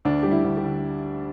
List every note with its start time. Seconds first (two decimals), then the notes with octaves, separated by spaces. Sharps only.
0.05 D2 D4
0.23 G3 G4
0.31 E4
0.44 D2
0.57 G4
0.64 D3